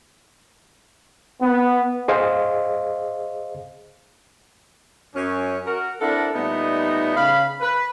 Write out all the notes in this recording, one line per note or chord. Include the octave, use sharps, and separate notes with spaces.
B3
G#4 C5 D#5 F5
F#2 C#4
F#4 A#4
C4 D4 E4 A4 A#4 F#5
A#2 G3 A3 B3 D#4
C#3 F5 B5
B4